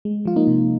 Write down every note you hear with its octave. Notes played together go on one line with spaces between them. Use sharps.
G#3
F3 F4
A#3 D#4
C3